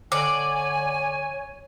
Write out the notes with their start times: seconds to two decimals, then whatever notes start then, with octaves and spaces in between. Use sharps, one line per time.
0.12 D3 C#5 D5 G#5